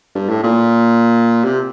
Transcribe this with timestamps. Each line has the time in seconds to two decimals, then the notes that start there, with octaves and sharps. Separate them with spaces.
0.15 G2
0.29 A2
0.43 A#2
1.44 C3